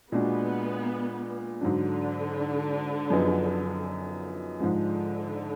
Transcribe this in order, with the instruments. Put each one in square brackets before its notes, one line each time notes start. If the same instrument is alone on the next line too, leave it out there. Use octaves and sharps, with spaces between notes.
[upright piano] A#2 G#3 D4 F#4 [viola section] B3
[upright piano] G#2 F#3 D4 [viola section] D3
[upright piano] F#2 F3 B3 D#4 G#4
[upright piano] G#2 F3 G#3 [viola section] D3